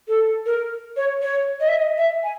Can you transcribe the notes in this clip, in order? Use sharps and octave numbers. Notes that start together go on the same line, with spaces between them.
A4
A#4
C#5
C#5
D#5
E5
D#5
E5
G#5